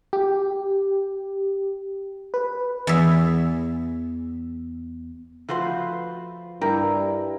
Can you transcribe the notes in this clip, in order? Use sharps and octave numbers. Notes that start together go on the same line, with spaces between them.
G4
B4
E2 E5
F3 A3 F#4 B4 C5 C6
G2 E4 G4 A#4